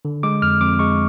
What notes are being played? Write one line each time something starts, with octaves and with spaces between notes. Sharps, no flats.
D3
G#3 D6
F2 F6
F2 D6
G#3 C#6